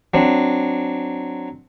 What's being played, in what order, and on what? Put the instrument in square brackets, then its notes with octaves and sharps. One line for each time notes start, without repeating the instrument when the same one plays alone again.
[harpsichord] F#3 C4 D4